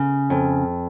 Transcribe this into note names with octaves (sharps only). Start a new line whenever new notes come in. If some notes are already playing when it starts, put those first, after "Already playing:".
Already playing: C#3
F2